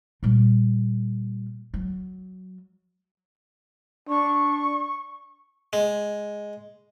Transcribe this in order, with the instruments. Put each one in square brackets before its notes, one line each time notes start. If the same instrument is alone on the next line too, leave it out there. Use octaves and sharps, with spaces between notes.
[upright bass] A#2 G3
F#3
[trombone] D4 [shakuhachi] C#6
[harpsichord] G#3